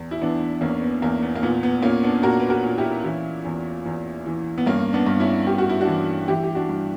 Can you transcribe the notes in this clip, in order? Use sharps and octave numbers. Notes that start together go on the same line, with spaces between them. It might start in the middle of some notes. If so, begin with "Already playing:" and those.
Already playing: E2
E4
E3 B3 D4
E2 A#3 C#4
B3
E2 A#3
B3
A#3
A#2 B3
B3
A#2 A#3 C#4
B3 D4
A#2 F#4 A#4
B4
F#4 A#4
A#2
E4 G4
E3 C#4 E4
E2
E2
E3
B3
G2 A#3 C#4
B3 D4
G2
C#4 E4
G2 G4
F#4
E4
D4 F#4
E3
E3 E4 G4
G4
D4 F#4
G2